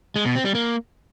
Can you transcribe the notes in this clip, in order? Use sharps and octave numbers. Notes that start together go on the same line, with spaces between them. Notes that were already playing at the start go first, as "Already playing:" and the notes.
G#3
B2
C4
G3
A#3